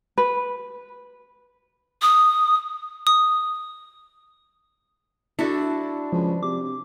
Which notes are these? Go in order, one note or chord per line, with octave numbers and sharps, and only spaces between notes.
B4
D#6
D#6
D4 E4 F#4 A4
C#2 F3
C3 D6